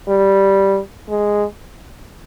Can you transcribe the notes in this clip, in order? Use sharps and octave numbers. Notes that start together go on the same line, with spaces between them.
G3
G#3